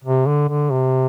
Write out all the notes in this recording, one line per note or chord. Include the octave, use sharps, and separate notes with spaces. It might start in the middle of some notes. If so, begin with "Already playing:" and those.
C3
D3
D3
C3